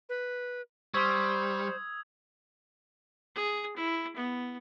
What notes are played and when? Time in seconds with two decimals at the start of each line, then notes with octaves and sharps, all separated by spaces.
0.09 B4
0.94 G3 C5 C6 C#6 D#6 E6 G#6
3.35 G#4
3.76 E4
4.16 B3